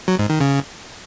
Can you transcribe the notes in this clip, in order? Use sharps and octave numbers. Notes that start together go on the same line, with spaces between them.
F#3
G#2
D#3
C#3